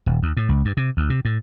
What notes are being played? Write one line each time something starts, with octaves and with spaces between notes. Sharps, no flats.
D#1
D#2
A2
C#2
G2
C3
D2
C3
A2